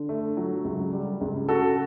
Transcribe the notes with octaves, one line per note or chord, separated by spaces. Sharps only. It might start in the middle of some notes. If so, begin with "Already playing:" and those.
Already playing: D3
A3
F#3
C#2
G3
C#2
C#3 F#4 A4